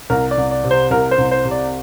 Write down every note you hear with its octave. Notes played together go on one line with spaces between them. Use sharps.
C2 A#4
D5
C2
D5
C3
C5
C2 A#4
C5
C2
C5
C3
D5